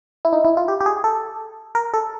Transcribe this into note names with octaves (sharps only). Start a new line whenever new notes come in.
E4
D#4
E4
F4
G4
G4
G#4
A4
A#4
A4